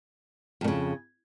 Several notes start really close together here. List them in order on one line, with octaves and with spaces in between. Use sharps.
F2 A#2 C#3